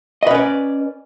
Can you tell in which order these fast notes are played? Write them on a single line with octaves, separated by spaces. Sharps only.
D#5 B4 C#4 D5